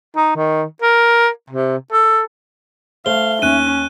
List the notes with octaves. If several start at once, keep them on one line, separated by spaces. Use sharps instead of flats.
D#4
D#3
A#4
C3
A4
A3 C5 E5 F5 G7
D#2 C#4 F#6 D#7